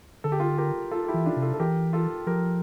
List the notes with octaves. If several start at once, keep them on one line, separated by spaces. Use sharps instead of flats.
D3 A4
G4
F4 A4
G4 A#4
F4 A4
A4
E4 G4
E3
D4 F4
C3
F4 A4
A4
E3 G4 A#4
F4 A4
F3 G4 A#4